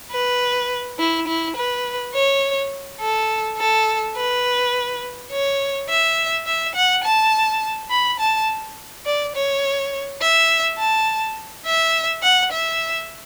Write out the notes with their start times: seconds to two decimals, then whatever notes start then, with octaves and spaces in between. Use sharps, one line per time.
0.12 B4
0.99 E4
1.28 E4
1.56 B4
2.15 C#5
3.00 A4
3.58 A4
4.16 B4
5.32 C#5
5.89 E5
6.46 E5
6.75 F#5
7.04 A5
7.91 B5
8.20 A5
9.05 D5
9.35 C#5
10.22 E5
10.79 A5
11.66 E5
12.23 F#5
12.52 E5